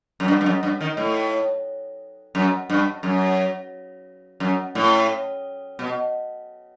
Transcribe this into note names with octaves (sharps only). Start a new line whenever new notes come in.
F#2
G2
G2
F#2
G2
D#3
A2
F#2
G2
F#2
F#2
A2
B2